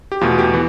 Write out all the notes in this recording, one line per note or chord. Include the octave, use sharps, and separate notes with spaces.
G4
E2 B2 A3 F4
G4
E3